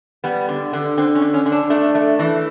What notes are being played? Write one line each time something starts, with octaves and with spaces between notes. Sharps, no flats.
G3 B3
D3
D3
D3 C4
C#4
D3
C#4
D3
D4
A3 D4
A3
E3